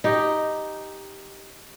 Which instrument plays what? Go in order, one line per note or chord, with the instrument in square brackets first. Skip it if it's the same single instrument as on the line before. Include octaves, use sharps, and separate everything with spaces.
[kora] D#4 G4